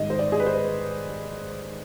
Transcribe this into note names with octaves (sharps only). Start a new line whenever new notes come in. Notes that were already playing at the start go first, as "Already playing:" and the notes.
Already playing: G#2 D#3 G3 D#5
C5
D5
G#4
B4
C5